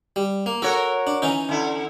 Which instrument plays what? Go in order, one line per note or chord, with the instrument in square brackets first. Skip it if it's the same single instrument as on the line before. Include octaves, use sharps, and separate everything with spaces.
[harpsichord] G3
A#3
[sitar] F#4 A#4 C#5 [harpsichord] A4
[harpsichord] D4
E3 C#4 D#4
[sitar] D3 E4